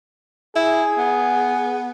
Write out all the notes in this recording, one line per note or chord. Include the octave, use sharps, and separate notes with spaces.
E4 G#4
B3